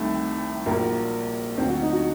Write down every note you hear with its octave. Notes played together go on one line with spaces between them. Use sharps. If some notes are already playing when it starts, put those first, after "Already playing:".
Already playing: C2 C3 D#3 A3
A#1 A#2 F#3 A#3
D2 D3 F#3 C4
F#4
D#4
F#4